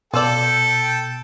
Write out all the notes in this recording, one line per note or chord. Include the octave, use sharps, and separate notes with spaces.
B2 F4 A4 D5 G5 E6